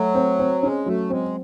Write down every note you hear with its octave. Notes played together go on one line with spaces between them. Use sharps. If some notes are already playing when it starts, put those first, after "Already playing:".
Already playing: F#3 A3
C4
C4
G#3 C#4
F#3 A3
G#3 C4